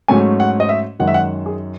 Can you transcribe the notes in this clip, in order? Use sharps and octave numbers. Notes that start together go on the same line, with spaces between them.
G#2 F#3 A3 C#4 G#5
F#5
D#5
E5
F#2 D#3 G#3 F#5
E5
F#5
G#4